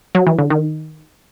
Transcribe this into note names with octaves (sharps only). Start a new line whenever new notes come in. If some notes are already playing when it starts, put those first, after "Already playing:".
F#3
E3
D3
D#3